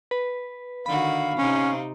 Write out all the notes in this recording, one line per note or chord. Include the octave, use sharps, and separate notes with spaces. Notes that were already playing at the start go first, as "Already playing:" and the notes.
B4
D3 D#3 F#4 F5 B5
C3 C4 C#4 D#4